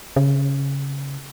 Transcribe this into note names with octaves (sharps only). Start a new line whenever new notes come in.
C#3